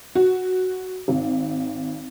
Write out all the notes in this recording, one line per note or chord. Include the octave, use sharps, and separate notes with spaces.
F#4
G#1